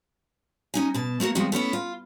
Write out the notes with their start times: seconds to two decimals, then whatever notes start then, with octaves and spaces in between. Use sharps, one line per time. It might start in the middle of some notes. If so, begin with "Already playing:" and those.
0.74 C#4 D#4 G#5
0.94 B2 A5
1.20 A3 A#3 F#4 A#4
1.35 F3 G3 G#3 C4 F#4
1.52 A3 B3 C#4 E4
1.73 F4